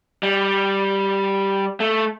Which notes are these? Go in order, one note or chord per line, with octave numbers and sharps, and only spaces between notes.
G3
A3